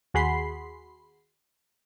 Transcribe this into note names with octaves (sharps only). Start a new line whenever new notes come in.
D#2 F#4 G#4 B5 C6 C7